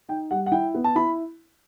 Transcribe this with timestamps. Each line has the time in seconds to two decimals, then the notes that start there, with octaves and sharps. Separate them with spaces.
0.09 D#4 G5
0.31 G3 F#5
0.46 F#5
0.52 E4 G5
0.74 B3
0.84 A5
0.95 E4 B5